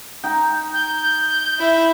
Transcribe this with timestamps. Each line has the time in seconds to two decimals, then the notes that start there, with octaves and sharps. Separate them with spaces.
0.24 D#4 G5
0.74 G6
1.59 E4